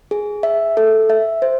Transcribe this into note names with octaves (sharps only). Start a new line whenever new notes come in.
G#4
E5
A4
E5
C5